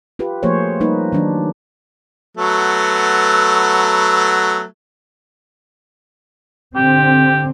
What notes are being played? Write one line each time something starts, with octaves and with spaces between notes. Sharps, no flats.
F4 G4 B4
F3 A3 A#3 G#4 C5 C#5
G3 A#3 D#4 B4
D#3 F#3 D4
F#3 A3 B3
D3 C4 G4